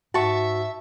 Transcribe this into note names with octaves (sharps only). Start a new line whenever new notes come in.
G#2 F#4 E5 A5 C#6